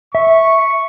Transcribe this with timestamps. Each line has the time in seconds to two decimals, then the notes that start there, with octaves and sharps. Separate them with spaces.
0.15 E5 C#6